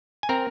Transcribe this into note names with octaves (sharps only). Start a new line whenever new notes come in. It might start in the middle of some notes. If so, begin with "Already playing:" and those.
G#5
C4 A#4 A#5